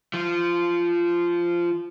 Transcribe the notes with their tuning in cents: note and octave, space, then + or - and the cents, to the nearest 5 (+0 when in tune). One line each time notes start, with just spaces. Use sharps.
F3 -15